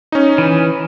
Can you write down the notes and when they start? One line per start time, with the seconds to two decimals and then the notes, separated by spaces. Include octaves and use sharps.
0.12 C#4 D#4
0.38 E3